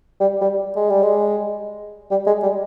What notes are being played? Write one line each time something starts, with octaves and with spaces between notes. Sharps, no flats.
G3
G3
G#3
G3
G#3
G3
G#3
G3